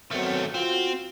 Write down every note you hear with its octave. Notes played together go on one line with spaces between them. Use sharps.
D#3 F#3 A3 B3 C4
C4 F4 F#4